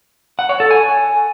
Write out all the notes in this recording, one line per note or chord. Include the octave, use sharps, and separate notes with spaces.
F#5
C#5
A4
G#5